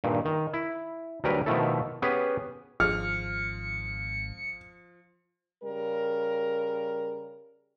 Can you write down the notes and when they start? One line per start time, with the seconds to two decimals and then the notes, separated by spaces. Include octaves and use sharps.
0.04 G2 A#2 D#3
0.25 D#3
0.53 E4
1.24 D2 F#3 G3 A#4 B4 G5
1.46 B2 D#3 F3 A3 E4 A4
2.02 B3 C#4 G4 G#4 B4
2.80 G#1 F3 F6 C#7
5.63 C#3 G3 A#4